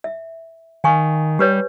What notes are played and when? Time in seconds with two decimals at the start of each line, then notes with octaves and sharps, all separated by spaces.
0.04 E5
0.84 D#3 F5 G#5 C#6
1.39 G3 G4 B4 C#5